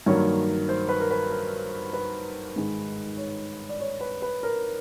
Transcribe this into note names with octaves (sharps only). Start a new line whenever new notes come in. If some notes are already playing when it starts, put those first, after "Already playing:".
G2 D#3 F#3 A#3 C#5
C5
B4
A#4
B4
A#4
B4
G#2 D#3 G#3
C#5
D5
C#5
B4
B4
A#4